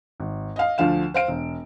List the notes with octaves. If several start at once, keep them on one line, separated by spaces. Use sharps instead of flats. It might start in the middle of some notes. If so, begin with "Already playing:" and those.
G#1
D#5 F5
D2 D3 F3 F5 E7
C5 F5 D7
E1